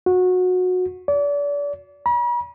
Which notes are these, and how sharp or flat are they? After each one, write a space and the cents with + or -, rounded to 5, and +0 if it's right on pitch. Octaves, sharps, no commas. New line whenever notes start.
F#4 -20
D5 -35
B5 -45